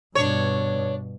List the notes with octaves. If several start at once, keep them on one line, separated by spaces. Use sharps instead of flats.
G2 B2 D4 C#5